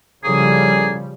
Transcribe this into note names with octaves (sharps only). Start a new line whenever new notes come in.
A2 C#3 F3 G3 A#3 G#4